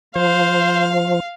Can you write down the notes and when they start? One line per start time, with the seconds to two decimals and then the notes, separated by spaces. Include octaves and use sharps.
0.16 F3 C5 F5